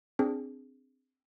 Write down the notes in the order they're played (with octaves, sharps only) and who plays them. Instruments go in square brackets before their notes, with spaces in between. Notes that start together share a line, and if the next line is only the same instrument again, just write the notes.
[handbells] C4 D4 G#4